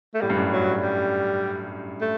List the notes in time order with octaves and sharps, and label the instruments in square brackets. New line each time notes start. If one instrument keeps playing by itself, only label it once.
[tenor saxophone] A3
[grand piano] A2 [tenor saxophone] G3
[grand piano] G2
F#2 A2
[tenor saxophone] F#3
G3
A3